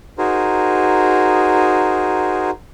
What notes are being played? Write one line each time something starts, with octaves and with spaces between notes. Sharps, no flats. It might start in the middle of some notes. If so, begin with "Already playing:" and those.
D#4 F#4 G#4 A#4 C5